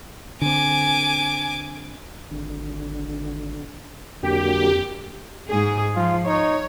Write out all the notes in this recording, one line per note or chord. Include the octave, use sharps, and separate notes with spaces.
D3 C4 G#5 D6
G#1 D3
F2 D3 F#3 A#3 G4
G#2 G#4
F3 F4
D#4 C#5